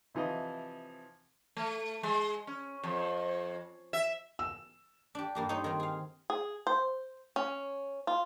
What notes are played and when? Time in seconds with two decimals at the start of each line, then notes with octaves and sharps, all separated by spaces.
0.15 C3 E3 F3 D#5
1.57 A3
2.03 G#3
2.47 C#4
2.83 F2
3.93 E5
4.39 E6
5.15 D4 G4
5.35 G2 A#3 G4
5.49 D#4 C5 C#5
5.64 D#3 C4
5.80 G#4 F5
6.30 G#4
6.67 C5
7.36 C#4
8.07 F4